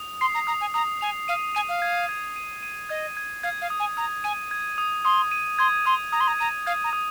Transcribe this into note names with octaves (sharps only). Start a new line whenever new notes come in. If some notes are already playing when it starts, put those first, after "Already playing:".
Already playing: D#6 F7
C6 C7
A#5
A#5 D#6
G#5
A#5 D#6
G#5 F7
F5 D#7
G#5 D#7
F5
G#6
G#6
D#7
D#7
D#5 G#6
G#6
F5 G#6
F5
D#6
G#5
A#5 D#6
G#5 D#7
G#6
D#6
C6 D#6
D#7
C6 G#6
C6 D#6
A#5 D#6
C6
A#5
A#5 D#7
F5 G#6
A#5
D#6